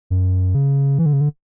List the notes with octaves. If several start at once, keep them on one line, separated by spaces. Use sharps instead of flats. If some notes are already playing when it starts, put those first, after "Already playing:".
F#2
C#3
E3
D3
C#3
D3